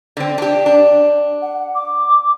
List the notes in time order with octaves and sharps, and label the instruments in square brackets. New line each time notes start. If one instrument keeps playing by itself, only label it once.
[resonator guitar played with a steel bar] D3 C4
D4 G4
D4
[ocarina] F#5
D6